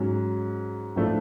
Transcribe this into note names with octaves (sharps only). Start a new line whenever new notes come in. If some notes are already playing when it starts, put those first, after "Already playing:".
Already playing: G#2 F#3 C#4
A2 F3 A3 D4